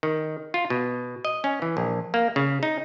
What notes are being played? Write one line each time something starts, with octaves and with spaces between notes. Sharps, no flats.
D#3
F4
B2
D#5
C#4
E3
A#1
A#3
C#3
D#4